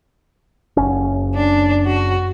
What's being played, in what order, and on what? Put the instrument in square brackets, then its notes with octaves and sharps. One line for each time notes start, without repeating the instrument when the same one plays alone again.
[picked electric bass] F#1 C#4
[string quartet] D4
F#4